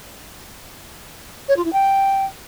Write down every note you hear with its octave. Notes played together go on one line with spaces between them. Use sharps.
C#5
F4
E4
G5